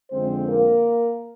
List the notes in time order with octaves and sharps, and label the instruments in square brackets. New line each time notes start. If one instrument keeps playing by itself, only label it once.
[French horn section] F2 D3 G#3 C4 C5
A#3 A#4